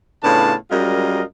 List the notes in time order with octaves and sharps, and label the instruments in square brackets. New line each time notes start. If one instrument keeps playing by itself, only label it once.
[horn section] A2 C#3 B3 D4 F4 A5
F#2 G3 G#3 F4 A#4 D#5